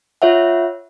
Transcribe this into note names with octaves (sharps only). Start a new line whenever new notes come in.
F4 C#5 E5 F#5